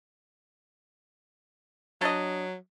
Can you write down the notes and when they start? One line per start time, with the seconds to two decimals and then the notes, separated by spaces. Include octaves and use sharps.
2.01 F#3 D4 D#5